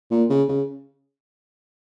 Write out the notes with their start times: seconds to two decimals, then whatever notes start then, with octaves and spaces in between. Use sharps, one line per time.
0.11 A#2
0.30 C#3
0.49 C#3